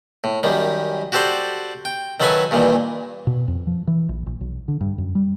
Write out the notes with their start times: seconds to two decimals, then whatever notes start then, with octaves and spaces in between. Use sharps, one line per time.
0.24 A2
0.43 F#2 D#3 G3
1.12 F#4 G4 A4 C5 D5
1.85 G5
2.20 D#3 F#3 A4 B4 E5 G#5
2.51 G2 A#2 D#3 E3
3.27 B2
3.48 F2
3.67 F3
3.87 E3
4.09 A#1
4.26 A#1
4.41 B1
4.68 D3
4.81 G2
4.98 F#2
5.15 G3